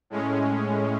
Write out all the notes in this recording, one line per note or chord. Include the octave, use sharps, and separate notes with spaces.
A2 G#3 C#4